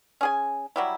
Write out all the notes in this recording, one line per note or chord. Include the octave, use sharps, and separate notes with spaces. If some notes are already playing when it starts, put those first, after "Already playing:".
C#4 G#4 G#5
F#3 G3 E4